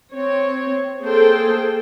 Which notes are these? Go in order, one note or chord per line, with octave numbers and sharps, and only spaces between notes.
C4 C#5
A#3 G#4 A4 C5 G5